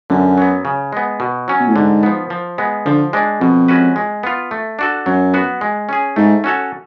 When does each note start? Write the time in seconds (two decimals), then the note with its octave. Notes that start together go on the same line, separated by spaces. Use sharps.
0.10 F#2 D3
0.38 F#3 B3
0.65 C#3
0.93 G#3 B3
1.20 B2
1.48 F#3 C#4
1.60 B2
1.68 A2
1.75 G#2 D3
2.03 F3 B3
2.30 F3
2.58 G#3 B3
2.85 D3 F3
3.13 G#3 D4
3.40 F2 B2
3.68 G#3 C#4 F#4 B4
3.96 G#3
4.23 B3 F4
4.51 A3
4.79 D4 F#4 A4
5.06 F#2 F#3
5.34 B3 F#4
5.61 G#3
5.89 C#4 G#4
6.16 G#2 A3
6.44 C#4 F#4 A4 C#5